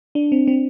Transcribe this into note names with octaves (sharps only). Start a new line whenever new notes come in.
D4
C4
C4